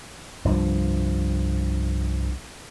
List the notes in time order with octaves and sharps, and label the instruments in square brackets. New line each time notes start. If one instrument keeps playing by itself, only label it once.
[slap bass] C2 G2 F3